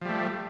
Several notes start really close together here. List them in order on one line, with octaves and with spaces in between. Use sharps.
F3 G3 A3